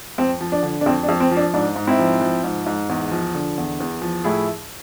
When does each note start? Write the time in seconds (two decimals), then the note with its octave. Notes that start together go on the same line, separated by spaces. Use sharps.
0.18 F2 C4
0.41 F3
0.52 D4
0.63 D3
0.81 D4
0.86 F2 C4
1.03 D4
1.08 F2
1.20 C4
1.31 F3
1.37 D4
1.54 G#2 D4
1.76 G#2
1.87 C4 E4
1.99 F3
2.21 F3
2.44 G#2
2.66 G#2
2.89 E2
3.12 F3
3.35 D3
3.58 E2
3.80 E2
4.02 F3
4.24 A2 E4 G#4